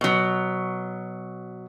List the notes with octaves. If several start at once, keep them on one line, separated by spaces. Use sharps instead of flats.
B2 F#3